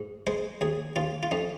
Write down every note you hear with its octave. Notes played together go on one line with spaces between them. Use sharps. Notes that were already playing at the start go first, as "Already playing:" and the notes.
Already playing: G#2
G#3 C5
D#2 G#4
D#2 F4
F4
F2 D#4